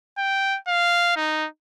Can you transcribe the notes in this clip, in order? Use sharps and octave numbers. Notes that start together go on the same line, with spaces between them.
G5
F5
D#4